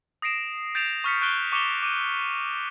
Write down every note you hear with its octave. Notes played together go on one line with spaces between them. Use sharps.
D#6 A#6 C7 D7 E7
G6 A6 C7 D7 E7 F7
C#6 F6 B6 C#7
C#6 F#6 D7 G7
C#6 D6 C#7 E7 F7 G7
D6 D#7